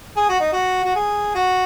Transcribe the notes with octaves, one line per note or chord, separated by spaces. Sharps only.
G#4
F#4
D#4
F#4
F#4
G#4
F#4